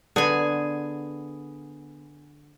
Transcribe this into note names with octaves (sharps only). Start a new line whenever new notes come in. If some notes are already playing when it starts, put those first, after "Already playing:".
D3 B3 G#4 G#5